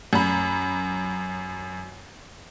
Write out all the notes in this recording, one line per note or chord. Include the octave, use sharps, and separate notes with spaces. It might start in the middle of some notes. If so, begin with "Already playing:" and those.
F#2 B5